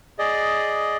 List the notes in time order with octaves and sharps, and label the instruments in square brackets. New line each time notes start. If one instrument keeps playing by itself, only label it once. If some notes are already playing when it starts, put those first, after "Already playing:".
[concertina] G#4 D5 D#5